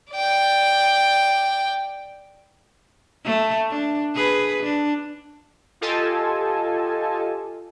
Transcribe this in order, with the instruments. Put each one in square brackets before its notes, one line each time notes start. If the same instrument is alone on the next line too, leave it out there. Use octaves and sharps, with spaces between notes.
[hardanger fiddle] D5 G5
[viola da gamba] A3
D4
G#4 B4
D4
[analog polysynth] F4 G4 A4 D#5 G#5 A5